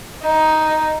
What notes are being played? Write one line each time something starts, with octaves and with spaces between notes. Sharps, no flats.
D#4